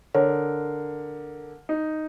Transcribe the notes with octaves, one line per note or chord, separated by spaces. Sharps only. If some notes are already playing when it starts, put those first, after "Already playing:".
D3 A#4 C#5
D#4